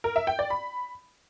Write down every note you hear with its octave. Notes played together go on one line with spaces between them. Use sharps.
A#4
E5
G5
D5
B5